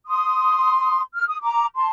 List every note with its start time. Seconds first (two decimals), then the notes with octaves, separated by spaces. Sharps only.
0.06 C6 D#6
1.15 F6
1.28 D#6
1.42 A#5 D6
1.75 A5 C6